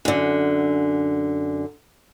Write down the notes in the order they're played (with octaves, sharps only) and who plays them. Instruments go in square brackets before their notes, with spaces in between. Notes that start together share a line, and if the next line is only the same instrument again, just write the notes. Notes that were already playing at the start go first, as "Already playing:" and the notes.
[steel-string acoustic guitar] F#2 D3